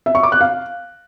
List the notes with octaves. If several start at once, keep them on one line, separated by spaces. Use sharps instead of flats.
E5
C#6
D6
F#6
F5